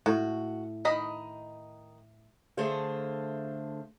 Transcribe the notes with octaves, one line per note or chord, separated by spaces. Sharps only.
A2 F#4
D#3 D#5 B5
D3 A3 G#4 A4 C5 F5